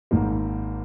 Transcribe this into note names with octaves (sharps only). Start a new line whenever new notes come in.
G#1 G#2 D#3 A#3